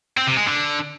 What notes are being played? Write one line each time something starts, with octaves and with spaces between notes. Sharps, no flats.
C4
C3
G#3
D3